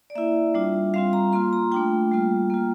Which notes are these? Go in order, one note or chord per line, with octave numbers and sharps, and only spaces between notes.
D5
A#3 E4 E5
G3 D4 F4
G3 C4 F4 F5
A#5
A#3 F4 C6
A#5
A3 D4 F4 G5
G3 A#3 F4
A#3 F4